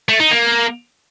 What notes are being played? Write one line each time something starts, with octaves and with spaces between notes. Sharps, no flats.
A3
D#4
A#3